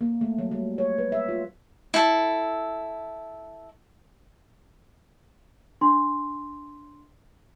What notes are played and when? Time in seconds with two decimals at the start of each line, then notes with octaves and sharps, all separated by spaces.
0.01 A#3
0.21 A3
0.38 F#3
0.51 G3
0.78 C#5
0.98 B4
1.12 E5
1.28 F4
1.94 E4 A4
5.81 D4 C6